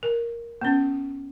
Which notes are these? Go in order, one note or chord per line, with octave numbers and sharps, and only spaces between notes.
A#4
B3 C#4